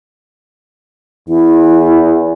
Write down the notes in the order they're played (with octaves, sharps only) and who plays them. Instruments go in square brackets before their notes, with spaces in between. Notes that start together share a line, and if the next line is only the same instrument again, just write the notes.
[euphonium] E2 [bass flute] E4